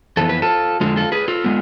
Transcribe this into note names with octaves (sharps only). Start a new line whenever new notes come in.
F2 E3 B3 A4
B4
F4 A4
F2 D3 G#3 F4 A4
F4 A4
G#4 B4
F4 A4
G#3 B3